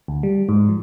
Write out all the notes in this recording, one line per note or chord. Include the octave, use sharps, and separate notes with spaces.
D2
G3
G#2
F3